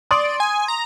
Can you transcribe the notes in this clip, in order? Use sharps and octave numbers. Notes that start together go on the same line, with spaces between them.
D5 C6 D#6
G#5
A#5